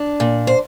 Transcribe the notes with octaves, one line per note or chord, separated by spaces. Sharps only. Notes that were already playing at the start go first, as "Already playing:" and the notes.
Already playing: D4
A#2
C5